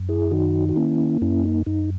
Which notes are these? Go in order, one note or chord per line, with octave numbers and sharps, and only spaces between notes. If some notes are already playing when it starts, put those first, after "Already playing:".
Already playing: F#2
E4 G#4
D#3 D#4 F#4
F#4
A#3 C#4 E4
F#2 C#4 E4
D#4
F#2 D#4